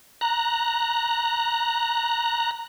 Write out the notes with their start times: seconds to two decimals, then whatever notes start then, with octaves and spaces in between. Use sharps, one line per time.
0.21 A#5 F#6